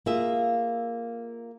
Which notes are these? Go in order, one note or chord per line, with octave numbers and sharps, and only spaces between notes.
A#3 F4 G#4 E5